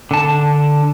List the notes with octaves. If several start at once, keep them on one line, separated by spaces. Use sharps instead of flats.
D3 A5